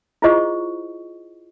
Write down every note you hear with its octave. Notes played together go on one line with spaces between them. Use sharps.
E4 F4 G#4 C5 D#5 C#6